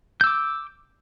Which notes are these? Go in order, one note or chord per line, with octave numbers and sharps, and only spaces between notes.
D6 E6 G6